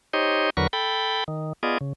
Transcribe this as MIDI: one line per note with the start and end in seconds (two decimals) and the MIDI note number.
0.13 0.50 63
0.13 0.50 67
0.13 0.50 72
0.13 0.50 73
0.13 0.50 75
0.57 0.67 40
0.57 0.67 50
0.57 0.67 54
0.57 0.67 70
0.57 0.67 71
0.57 0.67 85
0.73 1.24 69
0.73 1.24 79
0.73 1.24 83
1.28 1.53 51
1.63 1.78 59
1.63 1.78 65
1.63 1.78 68
1.63 1.78 74
1.63 1.78 75
1.81 1.93 49